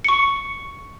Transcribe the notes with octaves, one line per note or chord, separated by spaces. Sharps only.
C#6 C#7